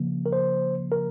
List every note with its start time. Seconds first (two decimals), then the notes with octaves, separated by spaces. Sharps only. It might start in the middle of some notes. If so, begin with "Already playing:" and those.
Already playing: C#3 F3 A#3
0.26 A#4
0.32 C5
0.92 A#4